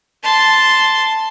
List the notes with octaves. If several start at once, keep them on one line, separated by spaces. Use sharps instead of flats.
A5 C6